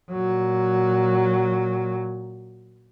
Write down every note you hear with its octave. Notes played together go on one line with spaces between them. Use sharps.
A#2 F#3